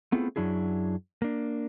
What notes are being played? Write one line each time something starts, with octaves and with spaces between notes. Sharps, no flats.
A3 B3 C4 E4 F4 G#4
F#2 F#3 D4 E4 G#4
A#3 D4